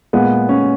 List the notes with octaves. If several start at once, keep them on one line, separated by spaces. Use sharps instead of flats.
A#2 G#3 B3
C#4